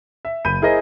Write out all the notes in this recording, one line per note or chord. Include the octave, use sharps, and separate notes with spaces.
E5
F#1 B5 G6 D#7
E4 G#4 A#4 C5 D#5